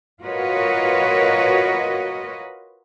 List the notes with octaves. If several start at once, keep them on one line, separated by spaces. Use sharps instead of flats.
F4 F#4 A#4 B4 C#5 D#5